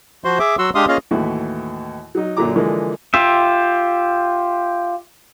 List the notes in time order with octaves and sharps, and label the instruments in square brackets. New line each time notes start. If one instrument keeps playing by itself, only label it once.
[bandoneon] F3 F#4 C5 C6
G#4 E5 D6
F#3 F#4 F#5 C6 E6
G#3 D4 G4 F5 C6 D#6
A#3 C#4 F4 G#4 D#5 F5
[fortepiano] D#2 A2 E3 E4 F#4
F#3 D#4
F#2 A#2 D3 F#3 A#5 D6
D3 E3 F3 G#3 A#3
[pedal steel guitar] F4 G4 E5